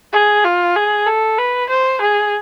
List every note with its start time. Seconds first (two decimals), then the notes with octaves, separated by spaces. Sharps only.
0.13 G#4
0.45 F4
0.76 G#4
1.07 A4
1.38 B4
1.70 C5
2.02 G#4